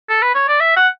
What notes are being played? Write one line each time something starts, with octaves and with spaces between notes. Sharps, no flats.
A4
B4
C#5
D5
E5
F#5